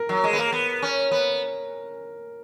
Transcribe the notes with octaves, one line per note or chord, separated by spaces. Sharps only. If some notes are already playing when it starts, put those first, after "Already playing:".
Already playing: A#4
F#3
G#3
B3
A#3
B3
C#4
B3